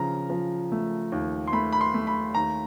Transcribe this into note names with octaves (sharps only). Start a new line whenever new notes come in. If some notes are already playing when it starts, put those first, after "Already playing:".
Already playing: C#3 F3 A#5
F3
A3
D#2
C6
A3 B5
B5
C6
A3
B5
D#2 A#5